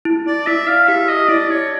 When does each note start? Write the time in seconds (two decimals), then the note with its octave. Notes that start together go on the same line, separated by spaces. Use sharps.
0.05 E4
0.27 D5
0.46 E4 E5
0.67 F5
0.88 G4 E5
1.09 D#5
1.29 E4 D5
1.50 C#5